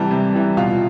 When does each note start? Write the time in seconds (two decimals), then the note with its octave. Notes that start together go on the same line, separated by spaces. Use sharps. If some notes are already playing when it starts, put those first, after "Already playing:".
Already playing: C3 E3 G3 A5
0.11 C3
0.33 E3 G3
0.57 B2 F4 F5